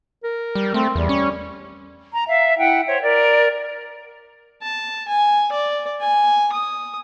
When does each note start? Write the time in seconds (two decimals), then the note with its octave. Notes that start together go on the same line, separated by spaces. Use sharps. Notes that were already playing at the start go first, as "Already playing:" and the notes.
0.24 A#4
0.55 G3
0.74 A3 C4
0.95 E2 G3
1.09 C#4 C#6
2.13 A#5
2.28 E5 F5
2.57 E4 F#5 G5
2.86 C5 C#5 E5
3.02 A#4 D5
4.63 A5
5.08 G#5
5.52 D5
6.01 G#5
6.53 D#6